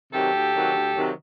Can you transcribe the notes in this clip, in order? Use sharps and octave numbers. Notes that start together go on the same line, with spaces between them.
C3 D#3 F#3 G4 A4
D2
C3 D#3 F#3
D2
C3 D#3 F#3